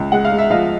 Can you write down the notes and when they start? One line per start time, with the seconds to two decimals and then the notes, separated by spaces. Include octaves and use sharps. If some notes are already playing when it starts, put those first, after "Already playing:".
Already playing: C#2
0.12 G#3 F#5
0.25 F5
0.31 G#3
0.38 E5
0.50 F3 D#5 F5